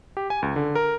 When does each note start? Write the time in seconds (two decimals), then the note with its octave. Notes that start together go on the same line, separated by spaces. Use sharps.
0.17 G4
0.30 G#5
0.42 C#2
0.56 D3
0.75 A#4